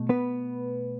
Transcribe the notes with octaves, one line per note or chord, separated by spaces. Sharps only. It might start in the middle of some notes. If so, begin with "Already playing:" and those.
Already playing: B2 A3
B3 B4